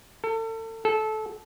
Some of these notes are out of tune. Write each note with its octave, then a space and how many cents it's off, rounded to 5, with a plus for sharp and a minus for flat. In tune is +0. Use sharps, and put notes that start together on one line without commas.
A4 +35
A4 -20